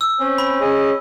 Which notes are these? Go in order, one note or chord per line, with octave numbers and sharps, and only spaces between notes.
E6
C4 C#4
B5
C#4 G#4 D#5